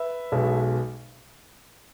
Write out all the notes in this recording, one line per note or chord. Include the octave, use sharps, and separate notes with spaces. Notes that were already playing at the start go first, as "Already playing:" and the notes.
Already playing: B4 E5
B1 B2 G#3